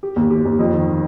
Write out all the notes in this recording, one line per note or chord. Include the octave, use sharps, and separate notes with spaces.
G4
D#2
G4
D#2
F2
D#3